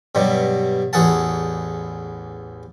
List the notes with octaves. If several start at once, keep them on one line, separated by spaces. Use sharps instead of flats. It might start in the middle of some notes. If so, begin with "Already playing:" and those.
G2 B2 F#3 G3
A1 E2 G#4 A4 F#5 A5